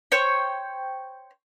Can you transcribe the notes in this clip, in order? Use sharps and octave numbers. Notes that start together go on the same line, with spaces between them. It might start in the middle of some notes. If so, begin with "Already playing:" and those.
C5 C#5 G5